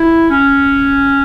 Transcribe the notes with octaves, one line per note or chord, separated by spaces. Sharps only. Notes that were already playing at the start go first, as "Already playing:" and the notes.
Already playing: E4
C#4